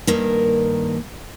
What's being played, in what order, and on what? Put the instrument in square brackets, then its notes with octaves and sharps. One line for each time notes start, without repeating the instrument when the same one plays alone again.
[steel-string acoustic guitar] G2 D#3 A#3